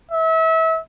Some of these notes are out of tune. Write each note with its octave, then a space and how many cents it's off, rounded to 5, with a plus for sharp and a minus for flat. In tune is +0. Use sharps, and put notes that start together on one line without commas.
E5 -30